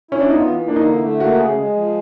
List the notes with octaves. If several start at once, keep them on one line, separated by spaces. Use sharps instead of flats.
C#4 E4
D4
B3 D#4
F4
E3
A#3 D4
D#4
D3 E4
A3
A#3 F#4
C#3 G#4
G#3
F3